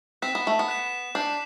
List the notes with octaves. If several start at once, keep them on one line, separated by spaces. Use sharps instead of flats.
C4 F#6 B6 E7
B3
A3
B3
F#6 B6 E7
D4 G6 C7 F#7